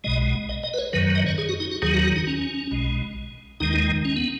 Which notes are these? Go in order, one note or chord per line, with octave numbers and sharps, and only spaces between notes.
B1 B2 G#3 D#5
D#5
D#5
B4
C#5
F#2 D#3 F#3 B4
D#5
C#5
G#4
F#4
D#4
F#4
D#2 D#3 F#3 G#4
F#4
F#4
D#4
C#4
B1 B2 G#3
D#2 D#3 G#3 D#4
C#4
B3